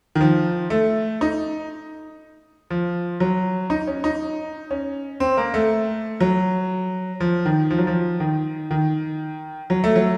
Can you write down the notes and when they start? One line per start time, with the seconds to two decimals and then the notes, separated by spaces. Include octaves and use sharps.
0.15 D#3
0.21 F3
0.70 A3
1.21 D#4
2.71 F3
3.20 F#3
3.70 D#4
3.87 C#4
4.04 D#4
4.71 C#4
5.20 C4
5.37 A#3
5.54 A3
6.20 F#3
7.20 F3
7.45 D#3
7.71 F3
7.78 F#3
7.87 F3
8.20 D#3
8.71 D#3
9.70 F#3
9.84 A3
9.96 F#3